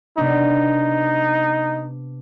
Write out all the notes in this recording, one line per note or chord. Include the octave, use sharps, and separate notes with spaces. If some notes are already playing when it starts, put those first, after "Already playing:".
C3 B3 D4 D#4